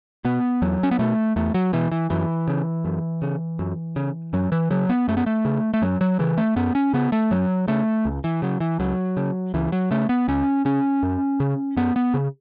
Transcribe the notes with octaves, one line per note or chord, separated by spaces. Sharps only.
B2 B3
E2 F#3
C#4
B3
B2 A3
E2 A3
F#3
B2 E3
E3
F#2 E3
C#3
F#2
C#3
F#2
C#3
F#2 F#3
E3
C#3 F#3
B3
F#2 A3
B3
A3
C#3
A3
F#2 F#3
F#3
C#3 E3
A3
F#2 B3
C#4
C#3 B3
A3
F#2 F#3
C#3 A3
C#2
E3
C#3 F#3
E3
C#2 F#3
C#3
C#2 E3
F#3
C#3 A3
B3
C#2 C#4
C#3 C#4
F#2
C#3
F#2 B3
B3
C#3